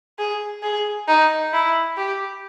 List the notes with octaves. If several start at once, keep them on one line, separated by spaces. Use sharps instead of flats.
G#4
G#4
D#4
E4
G4